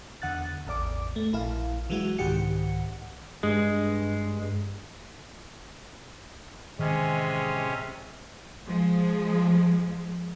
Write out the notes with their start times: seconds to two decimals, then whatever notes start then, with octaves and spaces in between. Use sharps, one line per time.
0.22 E2 D3 F#5 F#6 A6
0.67 A1 E2 D5 D6
1.16 A3
1.33 A#1 E4 F5
1.90 E3 F#3 G#3 E4 F#4
2.19 C2 G#2 D#3 G4 F#5 C#7
3.43 G2 G#3
6.79 A2 C3 D#3 E3 G#3 C#4
8.67 F3 G#3